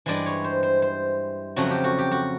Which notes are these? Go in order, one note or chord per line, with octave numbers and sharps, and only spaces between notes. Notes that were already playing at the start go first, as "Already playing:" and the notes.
G2 E3 G#3 D5
C#5
C5
C5
C5
F2 C#3 F#3 A3 F#4
G4
F#4
G4
F#4